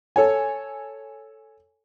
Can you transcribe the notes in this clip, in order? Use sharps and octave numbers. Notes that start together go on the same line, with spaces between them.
A4 C#5 G#5